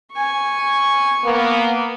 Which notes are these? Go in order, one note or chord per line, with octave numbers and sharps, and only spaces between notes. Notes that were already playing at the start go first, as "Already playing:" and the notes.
G#5 C#6
A#3 B3